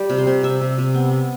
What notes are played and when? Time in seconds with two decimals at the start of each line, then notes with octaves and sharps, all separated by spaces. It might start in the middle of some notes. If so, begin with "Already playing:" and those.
Already playing: G3 G4
0.10 C3
0.18 C5
0.27 C3
0.43 C3 E5
0.61 C3
0.78 C3
0.94 B3
1.11 B3